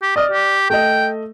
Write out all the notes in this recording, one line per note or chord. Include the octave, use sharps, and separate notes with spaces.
G4
D5 D#5 F6
G4
A3 A4 D#5 G5